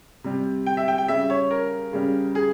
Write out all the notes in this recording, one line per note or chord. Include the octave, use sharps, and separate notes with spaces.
C3 G3
G5
E5
G5
G5
C#3 G3 E5
C#5
A#4
C#3 G3
G#4